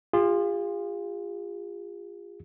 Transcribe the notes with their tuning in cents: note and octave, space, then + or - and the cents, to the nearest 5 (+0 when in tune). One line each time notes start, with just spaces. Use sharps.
F4 +0 G#4 -40